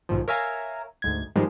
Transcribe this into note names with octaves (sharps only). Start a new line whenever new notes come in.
B1 G#2 D#3 F3
A#4 C#5 E5 F5 G#5 A#5
D2 G#2 G#6
G#2 D#3 F3 G3 G#3